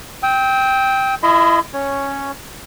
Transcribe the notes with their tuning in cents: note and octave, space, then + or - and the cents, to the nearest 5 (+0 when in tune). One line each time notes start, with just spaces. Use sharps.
G5 +0 E6 -40
E4 +30 D#5 +0 C6 -40
C#4 -5 C#5 +0